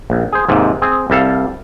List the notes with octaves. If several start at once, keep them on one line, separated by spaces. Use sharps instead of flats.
A#1
G#4 C5
D#2 G#2 C3
C4 G#4
C2 G3 A4 F5